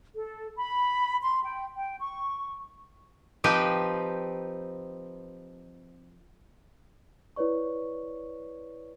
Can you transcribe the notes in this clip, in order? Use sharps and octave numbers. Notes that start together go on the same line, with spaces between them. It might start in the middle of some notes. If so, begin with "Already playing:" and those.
A4
B5
C6
G5
G5
C#6
F3 C4 D#4 G4 B4
E4 B4 C#5 D5 C#6